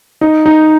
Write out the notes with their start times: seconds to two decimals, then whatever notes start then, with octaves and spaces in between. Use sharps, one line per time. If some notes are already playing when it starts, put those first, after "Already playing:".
0.21 D#4
0.46 D#4